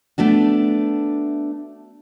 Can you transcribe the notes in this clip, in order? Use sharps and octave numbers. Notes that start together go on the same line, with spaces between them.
A3 B3 D4 F#4